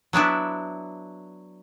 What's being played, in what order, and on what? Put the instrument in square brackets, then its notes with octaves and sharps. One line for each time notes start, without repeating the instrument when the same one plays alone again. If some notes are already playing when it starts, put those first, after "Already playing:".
[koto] F#3 B3 D4 E4